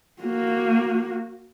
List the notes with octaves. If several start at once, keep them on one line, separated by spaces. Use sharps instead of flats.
A#3 F#4